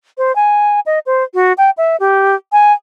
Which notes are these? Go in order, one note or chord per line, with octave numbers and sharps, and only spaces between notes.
C5
G#5
D#5
C5
F#4
G5
E5
G4
G#5